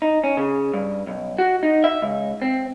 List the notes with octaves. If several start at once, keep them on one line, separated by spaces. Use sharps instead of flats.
D#4
C#4
C#3
G2
B1
F#4
D#4
E5
C#2
C4